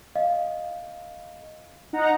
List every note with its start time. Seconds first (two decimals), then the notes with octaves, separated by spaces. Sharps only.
0.16 D#5 F5
1.93 D#4 F#5 A#5